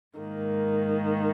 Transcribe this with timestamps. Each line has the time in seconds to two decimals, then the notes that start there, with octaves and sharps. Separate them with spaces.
0.18 G#2 D#3 A#3